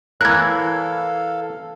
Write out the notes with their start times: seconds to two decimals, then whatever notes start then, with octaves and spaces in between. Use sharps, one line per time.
0.21 E3 E4 A4 A#4 C#5 F5 F#6 G#6